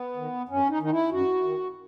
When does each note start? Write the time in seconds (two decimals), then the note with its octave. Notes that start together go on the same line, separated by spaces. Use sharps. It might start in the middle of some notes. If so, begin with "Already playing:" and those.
Already playing: B3
0.16 D#3
0.49 F#2 C#4
0.69 D#4
0.79 D#3 D#4
0.91 E4
1.11 F#2 F#4
1.44 D#3